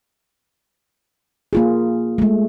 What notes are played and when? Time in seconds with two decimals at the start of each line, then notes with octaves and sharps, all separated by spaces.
1.53 A#3 F4 G#4
2.18 G#3 A3